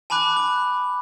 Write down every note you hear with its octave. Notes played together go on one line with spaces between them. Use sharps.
G#5 A5 B5 D6 F#6
F#6